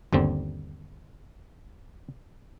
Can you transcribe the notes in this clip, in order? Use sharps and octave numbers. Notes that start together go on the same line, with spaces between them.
G1 D#2 D3 C4